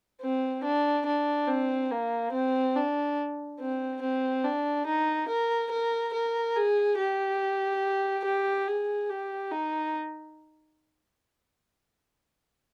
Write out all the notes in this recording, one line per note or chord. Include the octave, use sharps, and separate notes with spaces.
C4
D4
D4
C4
A#3
C4
D4
C4
C4
D4
D#4
A#4
A#4
A#4
G#4
G4
G4
G#4
G4
D#4